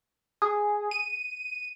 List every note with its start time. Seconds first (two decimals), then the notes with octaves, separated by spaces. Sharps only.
0.42 G#4
0.91 D#7